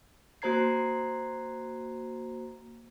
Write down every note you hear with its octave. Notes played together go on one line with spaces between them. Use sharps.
A#3 F#4 C5 A#5 G#6 C7